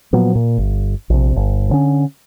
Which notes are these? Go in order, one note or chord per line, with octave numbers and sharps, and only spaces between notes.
A#2 F3 F#3 B3
A#2
G1
A#1 C3
G1
G2 D3 C#4